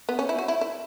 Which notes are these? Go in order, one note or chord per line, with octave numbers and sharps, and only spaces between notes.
B3
C#4
E4
F#4
E4
E4